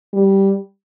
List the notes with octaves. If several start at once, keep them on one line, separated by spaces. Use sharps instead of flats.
G3